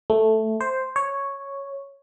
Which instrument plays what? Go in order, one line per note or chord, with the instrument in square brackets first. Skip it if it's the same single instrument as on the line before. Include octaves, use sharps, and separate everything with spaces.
[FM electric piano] A3
C5
C#5